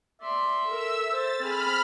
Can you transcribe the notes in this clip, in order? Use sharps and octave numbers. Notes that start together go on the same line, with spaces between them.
D5 E5 C6
A4 A#4 E6
C5 A6
C4 G#4 B5 F6